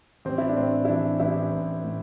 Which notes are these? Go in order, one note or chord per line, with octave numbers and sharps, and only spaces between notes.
A1 C4
E4
D4
A2 C4
E4
E3 D4
A1 E4
A1
A2